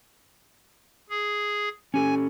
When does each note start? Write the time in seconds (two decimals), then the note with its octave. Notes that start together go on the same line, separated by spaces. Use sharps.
1.10 G#4
1.94 C#4 G4 A4 G#5